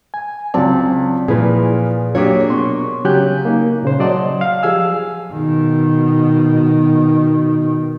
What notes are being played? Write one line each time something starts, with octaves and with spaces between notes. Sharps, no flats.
G#5
C#2 F#3 C4 D5 A5
A#2 E3 F3 G#4 B4
F#3 A#3 D4 F4 G4 G#4 C#5
B2 C6 C#6
C#3 F#3 G4 G#5 F#6 G6
A#3 D#4
A#2 C#3 C5
F#3 D5 D#5 F#5 A5 C6
F5
F3 G4 G#4 F5 G#5 E6
B2 D#3